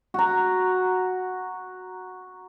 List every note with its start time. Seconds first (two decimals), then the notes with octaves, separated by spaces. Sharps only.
0.14 F#4 A#5